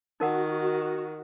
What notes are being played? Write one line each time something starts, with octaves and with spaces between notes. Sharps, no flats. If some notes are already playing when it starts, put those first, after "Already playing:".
D#3 D#4 F#4 A#4 F#5